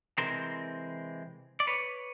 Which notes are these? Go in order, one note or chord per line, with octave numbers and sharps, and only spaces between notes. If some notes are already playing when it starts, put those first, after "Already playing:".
C3 E3 G#3 C4 A#4 C5
D5
B4 C#5